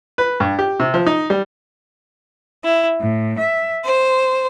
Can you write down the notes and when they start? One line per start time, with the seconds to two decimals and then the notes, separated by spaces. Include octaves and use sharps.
0.18 B4
0.40 G2
0.59 G4
0.80 C3
0.94 F3
1.06 D#4
1.30 G3
2.64 E4
2.99 A2
3.38 E5
3.85 C5